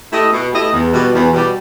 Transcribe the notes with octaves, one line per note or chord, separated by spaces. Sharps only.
A3 E4 G4 D#5
B2
A3 E4 G4 D#5
E2
B2 G3
E2
B2 G3